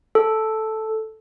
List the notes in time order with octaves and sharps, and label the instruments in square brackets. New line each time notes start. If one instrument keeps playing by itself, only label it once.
[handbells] A4